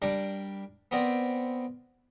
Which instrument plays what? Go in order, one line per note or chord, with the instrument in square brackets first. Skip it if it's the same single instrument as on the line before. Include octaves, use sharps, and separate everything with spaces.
[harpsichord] G3 D4 A#4
B3 C4 A#4 D5